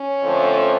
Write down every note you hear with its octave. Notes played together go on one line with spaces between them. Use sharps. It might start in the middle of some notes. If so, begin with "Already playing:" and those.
Already playing: C#4
F2 D3 F3 A3